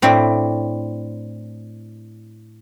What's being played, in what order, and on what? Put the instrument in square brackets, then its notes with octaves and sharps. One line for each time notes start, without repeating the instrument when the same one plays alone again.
[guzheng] A2 C4 D4 E5